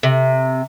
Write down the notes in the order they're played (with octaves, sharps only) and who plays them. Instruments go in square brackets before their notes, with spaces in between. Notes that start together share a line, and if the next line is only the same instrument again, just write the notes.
[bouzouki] C3